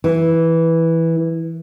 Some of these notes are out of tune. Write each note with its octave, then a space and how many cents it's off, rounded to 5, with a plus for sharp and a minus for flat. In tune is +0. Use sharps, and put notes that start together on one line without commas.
E3 -5